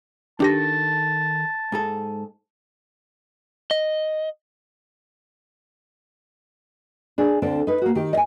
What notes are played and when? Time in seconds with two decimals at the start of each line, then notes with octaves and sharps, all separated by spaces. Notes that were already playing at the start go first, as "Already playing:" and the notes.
0.40 D#3 D4 G4 A4 A5 A#6
1.72 G#2 G#4 A4
3.71 D#5
7.18 D4 G#4
7.42 D2 D3 C4 D4 A4
7.67 D#4 B4
7.82 A#3 F#4
7.95 D#3 G4
8.13 D#5 G#5